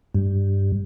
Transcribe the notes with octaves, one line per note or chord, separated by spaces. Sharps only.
G2